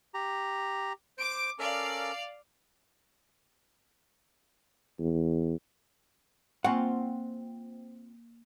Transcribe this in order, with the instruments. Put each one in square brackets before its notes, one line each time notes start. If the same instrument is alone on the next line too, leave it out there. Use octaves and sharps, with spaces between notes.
[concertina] G4 A#5
[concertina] C5 [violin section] D6 D7
[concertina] C#4 A4 A#4 [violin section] D5 F5
[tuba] E2
[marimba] A#3 G#5 C#6 [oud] C4 F4 [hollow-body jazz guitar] F#5